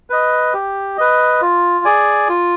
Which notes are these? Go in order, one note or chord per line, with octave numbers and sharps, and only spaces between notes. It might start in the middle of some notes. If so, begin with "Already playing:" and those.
B4 D#5
G4
B4 D#5
F4
G#4 D5 G#5
F4